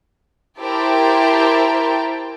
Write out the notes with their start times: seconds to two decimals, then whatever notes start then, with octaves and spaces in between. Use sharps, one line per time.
0.60 E4 G4 A#4 C5 G5 A5